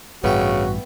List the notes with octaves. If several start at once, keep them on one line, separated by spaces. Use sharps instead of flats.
A1 G2 C#3 B3 F#4 E5 G5